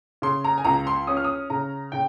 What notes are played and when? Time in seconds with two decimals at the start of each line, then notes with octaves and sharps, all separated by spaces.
0.22 C#3 C6
0.44 A#5
0.58 G#5
0.65 C#2 A#5
0.87 C6
1.07 C#4 D#6
1.17 F6
1.24 D#6
1.50 C#3 A#5
1.92 C#3 G5